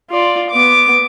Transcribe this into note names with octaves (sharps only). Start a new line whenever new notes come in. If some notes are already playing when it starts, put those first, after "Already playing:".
F4 D5
B3 D6